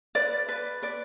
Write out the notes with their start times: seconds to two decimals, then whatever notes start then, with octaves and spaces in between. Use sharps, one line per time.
0.15 B4 D5
0.49 B4
0.82 B4 D5